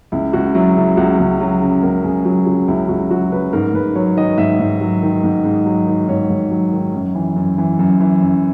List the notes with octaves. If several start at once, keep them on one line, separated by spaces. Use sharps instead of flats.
C#2 E4
C#2 F#4
F#3 E4
C#3 E4
C#2 F#4
C#2
F#3
C#3
C#2 A#4
C#2 G#4
F#3 F#4
C#3 F#4
C#2 E4
C#2 F#4
F#3 F#4
C#3 B4
G#2 A#4
G#2 B4
F#3 C#5
D#3 D#5
G#2 E5
G#2
F#3
D#3
G#2
G#2
F#3
D#3
G#2 C#5
G#2
F#3
D#3
F#2
E3
F#2
E3
F#2
E3
F#2